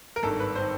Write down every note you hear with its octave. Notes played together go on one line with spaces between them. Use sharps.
A#4
G#1 G2 D#3 A4
B4
D#3 C5